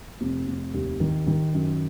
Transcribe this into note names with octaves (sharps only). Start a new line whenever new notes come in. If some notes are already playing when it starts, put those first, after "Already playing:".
F1
F1
D#2
D#3
D#3
F#2